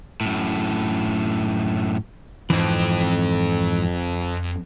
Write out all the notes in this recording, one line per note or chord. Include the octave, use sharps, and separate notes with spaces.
F#2 A2
F2 G#2 E3 C4